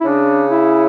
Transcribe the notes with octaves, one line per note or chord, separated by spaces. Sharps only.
E4
C#3 D4
E4